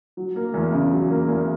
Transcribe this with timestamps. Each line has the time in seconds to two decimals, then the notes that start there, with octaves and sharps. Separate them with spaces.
0.17 F#3
0.36 A#3
0.54 E2
0.72 C#3
0.92 F#3
1.10 A#3
1.29 E2